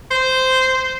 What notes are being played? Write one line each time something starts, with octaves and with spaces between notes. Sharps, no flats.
C5